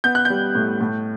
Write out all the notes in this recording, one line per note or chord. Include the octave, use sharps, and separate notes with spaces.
B3 G6
F#6
G3 G6
A2
A2